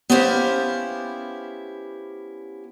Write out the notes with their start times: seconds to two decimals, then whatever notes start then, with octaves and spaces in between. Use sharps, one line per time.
0.10 B3 C#4 E4 G4 C5 F5